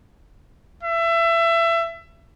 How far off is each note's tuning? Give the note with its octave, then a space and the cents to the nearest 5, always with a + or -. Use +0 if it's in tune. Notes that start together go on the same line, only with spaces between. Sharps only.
E5 +25